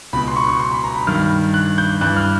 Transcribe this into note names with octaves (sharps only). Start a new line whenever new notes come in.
C#2 B2 B5
C6
C#6
C#6
C6
B5
A#5
B5
G2 D#3 F6
F#6
G6
G2 E3 F#6
F6